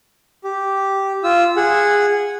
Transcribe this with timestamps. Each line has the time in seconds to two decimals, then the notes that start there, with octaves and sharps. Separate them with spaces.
0.44 G4
1.24 F4 E6
1.57 G#4 F#5